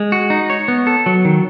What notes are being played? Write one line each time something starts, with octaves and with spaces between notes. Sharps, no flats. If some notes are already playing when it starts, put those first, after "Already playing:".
Already playing: G#3
F#4
D#4
C#5
B3
A4
F#3
D#3